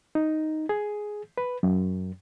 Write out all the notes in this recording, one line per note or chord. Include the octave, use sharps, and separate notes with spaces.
D#4
G#4
B4
F#2